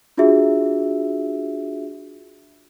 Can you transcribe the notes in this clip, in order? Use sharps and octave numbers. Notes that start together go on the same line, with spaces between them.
D4 F4 F#4 G#4 E5